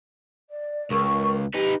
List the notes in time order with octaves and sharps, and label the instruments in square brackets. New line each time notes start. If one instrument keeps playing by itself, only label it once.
[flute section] D5
[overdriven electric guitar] C#2 [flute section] A#4 C#6
[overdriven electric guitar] D#4 B4 [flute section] G4